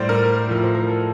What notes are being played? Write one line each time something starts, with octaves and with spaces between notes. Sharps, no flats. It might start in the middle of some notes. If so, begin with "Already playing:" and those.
Already playing: A2 G3 C5 D5
A#4
A2 F3
C5
A#4
A4